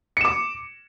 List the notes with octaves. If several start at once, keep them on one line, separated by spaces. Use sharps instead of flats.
D6 C#7 E7